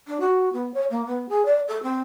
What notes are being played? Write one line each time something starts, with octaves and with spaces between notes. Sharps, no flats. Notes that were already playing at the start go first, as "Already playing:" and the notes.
D4
F#4
B3
C#5
A#3
B3
G#4
D5
A4
C4